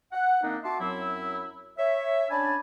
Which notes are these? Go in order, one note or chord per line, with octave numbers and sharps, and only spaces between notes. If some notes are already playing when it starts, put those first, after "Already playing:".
F#5
D#3 A#3 C4 D4 D#4
F#4 E5 A5 C6 D6
F#2 F#3 C4 E4 E6
C#5 E5
C#4 D4 D5 G#5 A5 B5